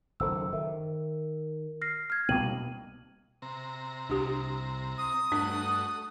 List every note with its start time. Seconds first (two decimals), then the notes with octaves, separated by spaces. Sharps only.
0.20 F#1 D#3 A4 C5 E6
0.53 D#3 E5
1.81 F6 A#6 C7
2.10 F6 G#6
2.29 C2 B2 A#3 G5 D#7 F#7
3.42 C3 A#5
4.09 C2 D4 G4
4.98 D#6
5.32 G2 A3 D4 F#4